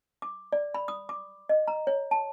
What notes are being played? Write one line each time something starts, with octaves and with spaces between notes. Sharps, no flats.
D6
D5
B5
D#6
D6
D#5
A#5
C#5
A5